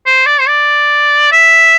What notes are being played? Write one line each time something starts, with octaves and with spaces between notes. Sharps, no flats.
C5
D5
C5
D5
E5